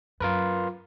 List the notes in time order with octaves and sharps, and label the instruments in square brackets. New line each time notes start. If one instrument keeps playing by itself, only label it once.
[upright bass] F#2 [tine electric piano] F4 A#4 B4